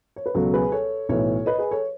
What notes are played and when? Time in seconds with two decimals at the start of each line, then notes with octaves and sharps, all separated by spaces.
0.16 C#5
0.26 B4
0.35 C#2 B2 F#3 F#4 A4
0.54 G#4 B4
0.72 A4 C#5
1.09 B1 A2 E3 A4 C#5
1.46 B4 D#5
1.59 G#4 B4
1.71 A4 C#5